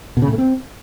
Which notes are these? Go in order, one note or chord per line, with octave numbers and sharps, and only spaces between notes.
B2
C#3
A2
A3
C4